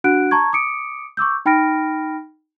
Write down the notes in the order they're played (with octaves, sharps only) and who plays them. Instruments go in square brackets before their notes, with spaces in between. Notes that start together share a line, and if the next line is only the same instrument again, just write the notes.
[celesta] D4 F#4 F#5 F#6 D7
A5 A#5 C#6 G#6
D6 D#6 C#7 D7
C#6 D6 E6 G6
D#4 G5 B5 F6 A#6 D7